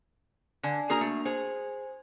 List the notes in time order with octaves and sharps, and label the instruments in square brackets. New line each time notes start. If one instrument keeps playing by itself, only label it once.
[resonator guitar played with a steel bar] D3 [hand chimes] D5 G#5
[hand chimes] A#3 D4 F#4 [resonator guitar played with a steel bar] G#4 A#4 A#5
[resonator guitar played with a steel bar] A3
[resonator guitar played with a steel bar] G#4 [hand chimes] C5 G#5